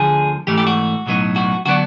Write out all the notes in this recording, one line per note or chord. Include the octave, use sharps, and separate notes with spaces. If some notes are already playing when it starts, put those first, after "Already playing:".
Already playing: D2 D3 F3 G#4
G#2 E3 A3 G4
G4
F#4
B1 A2 F#3 B3 D#4
F#4
D3 F#3 B3 D4 F#4